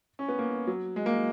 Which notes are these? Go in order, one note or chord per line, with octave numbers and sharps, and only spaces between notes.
C#4
B3
A#3
F#3
G#3
A#3